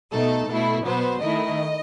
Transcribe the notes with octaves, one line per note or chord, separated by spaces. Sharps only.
B2 A3 D#4 A4
B2 A3 E4
B2 F#3 B3 C5
D#3 A3 E4 D#5